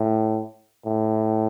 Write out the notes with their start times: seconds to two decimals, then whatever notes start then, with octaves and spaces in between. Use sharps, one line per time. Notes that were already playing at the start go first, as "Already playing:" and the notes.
Already playing: A2
0.86 A2